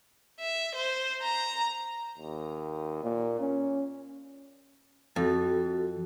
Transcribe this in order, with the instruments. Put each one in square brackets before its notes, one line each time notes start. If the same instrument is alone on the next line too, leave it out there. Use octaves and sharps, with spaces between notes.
[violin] E5
C5
A#5
[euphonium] D#2
A#2
C#4
[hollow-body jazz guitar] F2 [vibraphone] F#4 A4